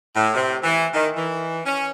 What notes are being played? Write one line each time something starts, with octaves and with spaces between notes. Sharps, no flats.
A2
C3
E3
D#3
E3
C#4